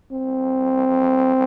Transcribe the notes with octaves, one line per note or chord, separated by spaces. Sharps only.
C4